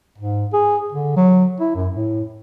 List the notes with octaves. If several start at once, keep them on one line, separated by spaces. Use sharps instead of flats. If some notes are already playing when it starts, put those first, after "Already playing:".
G#2
G#4
D3
F#3
E4
F#2
A2